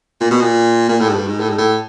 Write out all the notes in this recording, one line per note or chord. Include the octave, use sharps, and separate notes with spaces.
A#2
B2
A#2
A#2
A2
G#2
G2
G#2
A2
G#2
A2